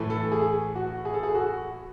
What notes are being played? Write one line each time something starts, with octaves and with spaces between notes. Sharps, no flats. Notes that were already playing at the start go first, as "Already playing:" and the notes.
Already playing: A2 E3 A3
A4
G#4
F#4
G#4
A4
G#4
F#4